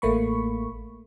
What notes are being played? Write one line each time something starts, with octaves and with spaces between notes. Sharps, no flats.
A1 A3 A#3 B5 C#6